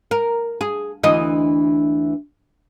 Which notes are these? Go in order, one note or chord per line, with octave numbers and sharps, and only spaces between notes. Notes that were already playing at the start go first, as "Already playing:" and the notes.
A#4
G#4
D2 E3 D#5